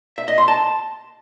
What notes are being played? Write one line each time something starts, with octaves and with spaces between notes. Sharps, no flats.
E5
D#5
C6
A5